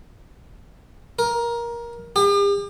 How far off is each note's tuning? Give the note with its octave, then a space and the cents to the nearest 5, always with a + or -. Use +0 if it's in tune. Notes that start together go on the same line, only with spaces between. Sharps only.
A#4 +15
G4 +45